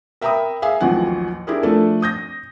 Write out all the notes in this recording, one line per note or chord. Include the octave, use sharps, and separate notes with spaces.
A#4 E5 G5 A#5 B5 D#6
G#4 E5 F5 G#5
A1 D#2 F3 F#3 F#5 G#5
D4 E4 G4 G#4 A#4
F3 A3 D4 A4 D5
D#6 G6 A#6